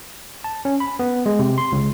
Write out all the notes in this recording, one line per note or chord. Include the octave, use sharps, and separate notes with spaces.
A5
C#4
B5
B3
G#3
C3
C6
C#2